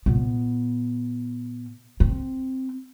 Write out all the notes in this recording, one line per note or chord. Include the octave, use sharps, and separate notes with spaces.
A#2 B3
C4